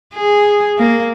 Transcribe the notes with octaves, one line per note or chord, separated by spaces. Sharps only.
G#4
A#3